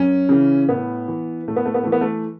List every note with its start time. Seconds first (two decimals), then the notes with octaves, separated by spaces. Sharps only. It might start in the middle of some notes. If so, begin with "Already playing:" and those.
Already playing: F#2 C#4
0.29 C#3 E3
0.68 A2 B3
1.08 E3
1.48 A2 A3
1.56 B3
1.65 A3
1.74 B3
1.83 E3 A3
1.92 B3
2.01 A3